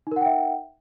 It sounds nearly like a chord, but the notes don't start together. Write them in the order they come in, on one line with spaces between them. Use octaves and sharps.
D#4 A#4 F#5 G5 E5